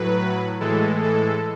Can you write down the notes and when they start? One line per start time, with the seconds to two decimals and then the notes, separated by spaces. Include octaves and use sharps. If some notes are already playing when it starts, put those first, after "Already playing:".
Already playing: A2 F#3 B4
0.60 A2 E3 G#3 A4
1.03 A4